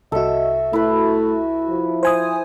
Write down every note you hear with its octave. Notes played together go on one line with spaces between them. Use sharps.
C2 F#4 A4 D#5 E5
A3 E4 B4
F3
C5 G#5 D#6